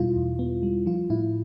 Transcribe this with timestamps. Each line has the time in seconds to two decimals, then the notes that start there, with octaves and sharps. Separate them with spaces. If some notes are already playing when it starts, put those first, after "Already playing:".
Already playing: E2 B2 G3 E4 F4
0.16 E2
0.39 B3
0.63 G3
0.86 F3 F4
1.10 A2 E4